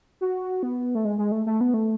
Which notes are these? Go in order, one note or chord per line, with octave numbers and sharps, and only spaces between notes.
F#4
B3
A3
G#3
G#3
A3
A3
B3
A3